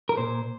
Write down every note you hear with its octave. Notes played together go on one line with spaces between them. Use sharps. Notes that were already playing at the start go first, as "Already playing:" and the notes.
A#4
A#2 C5